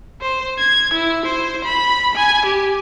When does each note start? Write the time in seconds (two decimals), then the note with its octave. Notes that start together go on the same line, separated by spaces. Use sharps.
0.22 C5
0.58 G#6
0.94 E4
1.26 C5
1.65 B5
2.15 G#5
2.46 G4